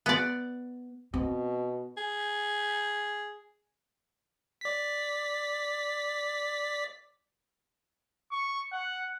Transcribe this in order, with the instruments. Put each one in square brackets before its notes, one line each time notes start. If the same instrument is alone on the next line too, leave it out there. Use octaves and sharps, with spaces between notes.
[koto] B3 D5
[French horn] B2 [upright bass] C4
[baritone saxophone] G#4
[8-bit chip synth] D5 B6
[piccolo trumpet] C#6
F#5